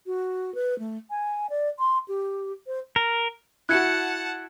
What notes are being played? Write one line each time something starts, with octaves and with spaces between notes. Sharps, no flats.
F#4
B4
A3
G#5
D5
C6
G4
C5
A#4
E4 F#4 F#5 A5 F#6 G#6 C#7